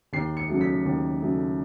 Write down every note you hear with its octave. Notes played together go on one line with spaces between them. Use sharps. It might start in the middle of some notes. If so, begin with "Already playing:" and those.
D#2 C7
C#7
C#3 F#3 A3
B6
D#2
C#3 F#3 A3